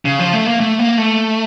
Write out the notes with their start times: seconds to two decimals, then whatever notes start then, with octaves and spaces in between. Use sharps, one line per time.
0.05 C#3
0.19 F3
0.33 A3
0.46 A#3
0.60 A3
0.79 A#3
0.98 A3